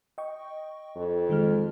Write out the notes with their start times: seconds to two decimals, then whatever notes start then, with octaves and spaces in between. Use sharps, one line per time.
0.18 D#5 G5 C#6
0.96 F2
1.29 D#3 G#3 F6